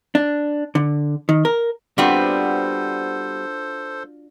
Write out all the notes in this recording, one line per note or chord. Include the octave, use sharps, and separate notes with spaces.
D4
D3
D#3
A#4
G3 B3 C4 D4 F4 F#4 A4 C5